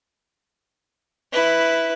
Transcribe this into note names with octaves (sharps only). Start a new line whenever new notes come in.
E4 B4